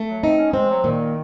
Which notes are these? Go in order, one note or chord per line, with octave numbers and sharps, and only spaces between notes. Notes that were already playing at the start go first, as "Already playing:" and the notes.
Already playing: A3
F#3
C4 D#4
C#4
G#3 C4
F#3
A#2 D#3